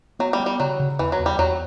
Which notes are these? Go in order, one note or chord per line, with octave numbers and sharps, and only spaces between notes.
F#3 B3
G3
B3
G3
C#3 F#3
C#3
E2 E3
F#3
E2
G3
E2 F#3